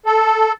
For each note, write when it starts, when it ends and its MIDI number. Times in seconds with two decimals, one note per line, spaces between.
0.06 0.52 69